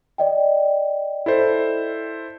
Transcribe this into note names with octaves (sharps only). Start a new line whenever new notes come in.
D5 D#5 G5
E4 A4 C5